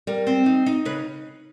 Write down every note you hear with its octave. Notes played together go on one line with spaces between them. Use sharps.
G3 A#4
C4
D#4
D#4
C#3 B4